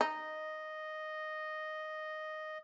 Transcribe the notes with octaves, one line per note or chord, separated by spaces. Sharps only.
D#4 D#5